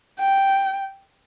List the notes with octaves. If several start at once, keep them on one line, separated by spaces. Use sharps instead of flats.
G5